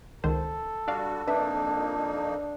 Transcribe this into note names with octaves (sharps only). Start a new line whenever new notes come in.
C#2 D#3 A4 C5
G3 D4 F#4 D5 F5
F2 A#3 D4 D#4 B4 E5